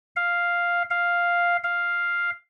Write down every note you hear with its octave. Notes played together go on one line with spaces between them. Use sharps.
F5
F5
F5